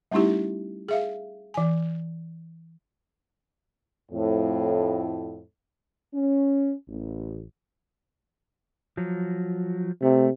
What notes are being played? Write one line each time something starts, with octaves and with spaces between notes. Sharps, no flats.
G3 A3 C#4 D#4 E4 G4
G#4 E5 F5
E3 G#5
F2 A2
C#4
A1
F3 F#3
C3 A3